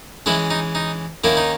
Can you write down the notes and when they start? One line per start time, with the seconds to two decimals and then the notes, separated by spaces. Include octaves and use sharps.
0.26 E3 G#3 C#4 E4
0.50 D#4
0.75 D#4
1.24 D#3 A#3 C#4 E4
1.37 D#4